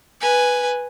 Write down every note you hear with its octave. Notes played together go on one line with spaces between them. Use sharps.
B4 G#5